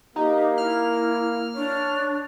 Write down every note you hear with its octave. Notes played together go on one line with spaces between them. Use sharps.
A#3 D#4 G4
E4 F6
D4 C#5